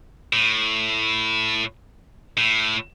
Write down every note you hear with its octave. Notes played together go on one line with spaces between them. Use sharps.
A2
A2